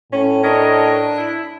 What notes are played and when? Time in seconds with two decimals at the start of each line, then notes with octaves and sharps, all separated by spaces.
0.12 A2 C#4
0.43 D4 A#4 C#5 D#5
1.17 E4